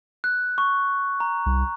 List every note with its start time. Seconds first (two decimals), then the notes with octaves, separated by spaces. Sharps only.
0.24 F#6
0.58 C#6
1.20 A#5
1.46 C2